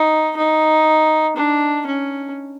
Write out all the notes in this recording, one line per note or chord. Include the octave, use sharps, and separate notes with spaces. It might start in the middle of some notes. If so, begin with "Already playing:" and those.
Already playing: D#4
D#4
D4
C#4